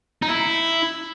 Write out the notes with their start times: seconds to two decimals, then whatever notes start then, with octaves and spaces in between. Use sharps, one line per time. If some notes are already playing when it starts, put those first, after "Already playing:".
0.23 D#4
0.29 E4